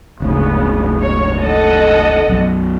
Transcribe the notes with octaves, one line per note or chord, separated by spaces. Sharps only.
F#1 D2 G#2 C#3 B3
C#5
A4 D#5 F#5
B1 F#2 B2